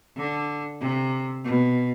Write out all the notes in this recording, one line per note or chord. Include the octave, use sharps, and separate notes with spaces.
D3
C3
B2